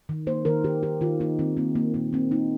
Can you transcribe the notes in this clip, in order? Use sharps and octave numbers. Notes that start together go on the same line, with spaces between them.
D#3
A#3 C5
D#3 A#4
D#3 G4
D#3 G4
D#3 F4
A#3 D#4
D#3 C4
A#3 C4
A#3
A#2 A#3
A#3 C4
A#3 D#4